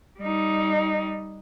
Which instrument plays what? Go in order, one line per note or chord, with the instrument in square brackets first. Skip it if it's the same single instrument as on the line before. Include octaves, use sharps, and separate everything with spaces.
[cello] G3 D#4